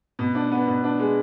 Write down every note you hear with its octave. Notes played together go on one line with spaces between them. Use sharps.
B2
D4
B3
B2
D4
G#3